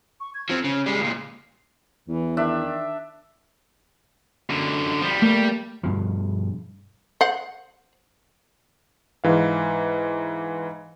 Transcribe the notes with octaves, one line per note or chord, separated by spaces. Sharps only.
C#6
G#6
F3 C4
C#3
G3 G#3 C7
C#2 A#2
E2 E3
D#3 D4 E5
F#2 D3
F3 G3
G3 A3 A#3
G2 B2 F3
C5 F#5
G#2 E3 F5